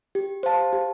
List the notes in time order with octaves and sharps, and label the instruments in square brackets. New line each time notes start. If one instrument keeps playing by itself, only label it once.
[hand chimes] G4
C5 F5 A5
G4